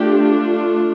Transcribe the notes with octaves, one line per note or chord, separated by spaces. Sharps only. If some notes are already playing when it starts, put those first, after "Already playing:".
Already playing: A3 D4 F4 G4